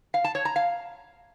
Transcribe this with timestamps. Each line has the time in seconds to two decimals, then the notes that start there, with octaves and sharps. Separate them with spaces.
0.14 F5
0.24 A5
0.35 C#5
0.45 A#5
0.56 F5